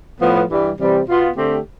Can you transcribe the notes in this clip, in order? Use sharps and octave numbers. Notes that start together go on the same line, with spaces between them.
A2 F3 B3
G2 E3 G3
C3 E3 G3 C4
B2 B3 F4
D3 A3 C4 G4